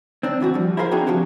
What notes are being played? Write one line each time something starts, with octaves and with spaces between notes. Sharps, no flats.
C4 D4
A2 E3 F4 F#4
F3 G3
E4 F4 G#4 A#4 C5 F5
C4 D4 D#4 F#4 G#4
F3 D4 F#4 G4